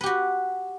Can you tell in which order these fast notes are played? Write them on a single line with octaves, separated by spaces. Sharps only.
B4 G4 F#4